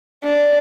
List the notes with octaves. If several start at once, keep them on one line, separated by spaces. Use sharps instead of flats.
D4